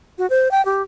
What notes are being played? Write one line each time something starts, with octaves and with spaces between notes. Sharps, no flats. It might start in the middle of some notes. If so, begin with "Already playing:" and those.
F#4
C5
G5
G4